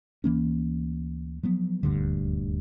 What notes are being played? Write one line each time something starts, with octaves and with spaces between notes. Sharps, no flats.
D2 E3 A#3 C#4
F3 F#3 B3
D#1 D2 G2 D3